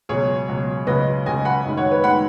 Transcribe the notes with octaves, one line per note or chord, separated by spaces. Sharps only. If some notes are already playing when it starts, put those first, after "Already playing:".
C#2 B2 F#3 G#4 C#5
C#2 B2 F#3
C#2 C#3 F#3 B4 D#5
C#2 C#3 F#3 D#5 G#5
F#5 B5
F#2 D#3 G#3
C#5 F#5
B4
D#3 G#3 F#5 B5